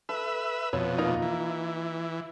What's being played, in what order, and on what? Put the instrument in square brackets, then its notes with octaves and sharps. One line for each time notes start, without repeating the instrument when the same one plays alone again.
[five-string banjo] A4 [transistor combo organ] B4 E5
[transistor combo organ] F2 B2 [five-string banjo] C#5
[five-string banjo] A#3 D#4 F4
[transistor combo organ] E3